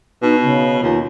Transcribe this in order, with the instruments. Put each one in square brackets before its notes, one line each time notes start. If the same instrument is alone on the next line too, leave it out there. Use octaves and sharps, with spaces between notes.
[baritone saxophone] B2 [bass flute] D#4
[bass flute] C#3
[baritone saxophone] D#2 [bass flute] F4